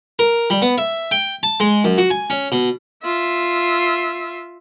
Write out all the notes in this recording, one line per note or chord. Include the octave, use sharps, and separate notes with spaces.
A#4
G3
B3
E5
G5
A5
G#3
F#2
F#4
G#5
C#4
B2
F4 E5